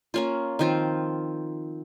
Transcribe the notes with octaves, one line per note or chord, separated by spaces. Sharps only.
A#3 C#4 F4
D#3 F3 C4 F4